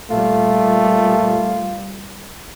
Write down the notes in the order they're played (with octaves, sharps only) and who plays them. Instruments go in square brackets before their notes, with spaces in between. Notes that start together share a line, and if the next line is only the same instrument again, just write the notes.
[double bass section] A#2 G3 [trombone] A3 [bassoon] F4